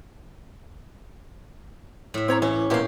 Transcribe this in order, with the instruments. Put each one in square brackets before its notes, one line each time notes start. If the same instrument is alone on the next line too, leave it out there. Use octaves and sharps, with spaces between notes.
[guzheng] A2 E5
[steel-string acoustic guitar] C4 C#5 A#5
[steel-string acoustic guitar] E3 [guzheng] C#4
[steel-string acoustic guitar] E2 A#2 E3 [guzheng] G4 F5